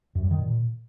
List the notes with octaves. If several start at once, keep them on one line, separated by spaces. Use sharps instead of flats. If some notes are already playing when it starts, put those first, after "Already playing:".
F#2
G2
D#3
A#2